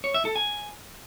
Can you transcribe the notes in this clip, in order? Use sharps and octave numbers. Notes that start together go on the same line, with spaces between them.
C#5
E5
A4
G#5